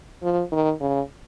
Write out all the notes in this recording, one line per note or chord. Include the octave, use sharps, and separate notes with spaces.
F3
D#3
C#3